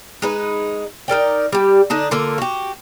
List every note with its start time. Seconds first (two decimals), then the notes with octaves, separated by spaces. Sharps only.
0.22 G#3 D#4 B4
1.08 D#4 A#4 D5 G5
1.52 G3 G4
1.90 D3 D4 D#4 A5
2.11 D3 A#3 F4 A4
2.38 F#4 G4